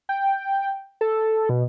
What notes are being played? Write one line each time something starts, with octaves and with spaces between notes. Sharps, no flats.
G5
A4
B2